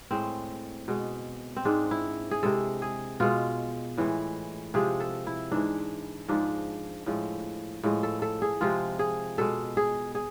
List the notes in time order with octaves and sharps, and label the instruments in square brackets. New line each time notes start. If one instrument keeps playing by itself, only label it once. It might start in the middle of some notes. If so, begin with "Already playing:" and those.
[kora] A2 G#3 C4
B2 G#3
C4
G#2 G#3 D4
E4
G#4
C3 G#3 A4
G#4
B2 G#3 F4
A2 E3 G#3
C3 F3 G#3 G#4
A4
E4
G#2 E3 G#3 D4
G#2 F3 G#3 D4
A2 F3 G#3
A2 F3 G#3
A4
A4
G#4
C3 F3 G#3 F4
G#4
B2 G#3 A4
G#4
G#4